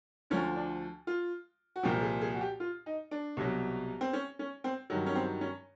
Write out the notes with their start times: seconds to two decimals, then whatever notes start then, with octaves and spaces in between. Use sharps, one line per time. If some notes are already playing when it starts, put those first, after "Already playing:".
0.30 D2 D3 F3 C#4
0.56 D4
1.07 F4
1.76 F#4
1.83 C2 A#2 F3 G4
2.03 G#4
2.22 G#4
2.34 F#4
2.41 G4
2.60 F4
2.86 D#4
3.11 D4
3.37 C2 B2 F#3
4.01 C4
4.13 C#4
4.39 C#4
4.64 C4
4.90 G2 D#3 F#3
5.06 C#4
5.15 C4
5.41 C#4